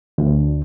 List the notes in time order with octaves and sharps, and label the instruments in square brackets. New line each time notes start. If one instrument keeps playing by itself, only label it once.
[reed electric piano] D2